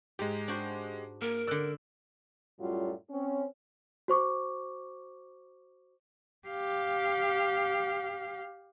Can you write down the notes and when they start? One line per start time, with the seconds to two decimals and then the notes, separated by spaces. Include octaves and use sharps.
0.19 G#2 G#3 G4
0.48 D4 F#4 C5
1.22 A#3 A#4
1.48 D3 D5 E6 F#6
2.60 F#2 A2 F#3 G3 F4
3.10 C4 C#4
4.08 F#4 C5 C#6 D6
6.48 G4 F5